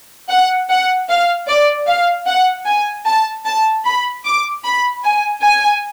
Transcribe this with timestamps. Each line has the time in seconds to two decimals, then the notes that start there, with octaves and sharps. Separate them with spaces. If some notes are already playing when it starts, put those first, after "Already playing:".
0.29 F#5
0.69 F#5
1.09 F5
1.48 D5
1.87 F5
2.27 F#5
2.66 G#5
3.06 A5
3.46 A5
3.85 B5
4.25 D6
4.64 B5
5.04 G#5
5.43 G#5